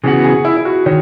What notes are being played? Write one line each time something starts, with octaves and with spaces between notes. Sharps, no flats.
C#3 E3 B3 F#4 G#4
G#4
E4
E4
F#4
D#3 C#5